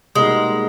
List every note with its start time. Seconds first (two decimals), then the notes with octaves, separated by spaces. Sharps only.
0.15 B2 G3 G#3 A#3 D#4